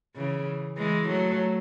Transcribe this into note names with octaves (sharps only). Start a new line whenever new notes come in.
C#3 E3
E3 G#3
F#3 A3